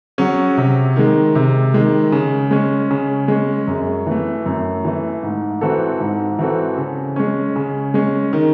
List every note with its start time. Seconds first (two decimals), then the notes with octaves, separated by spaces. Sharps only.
0.18 F#3 C#4 G#4
0.57 C3
0.96 D#3 G#3
1.35 C3
1.74 D#3 G#3
2.12 C#3
2.51 G#3 C#4
2.91 C#3
3.28 G#3 C#4
3.67 F#2
4.07 E3 A3
4.46 F#2
4.85 E3 A3
5.23 G#2
5.61 E3 C4 F#4 A4
6.00 G#2
6.39 E3 C4 F#4 A4
6.78 C#3
7.16 G#3 C#4
7.56 C#3
7.94 G#3 C#4
8.33 D#3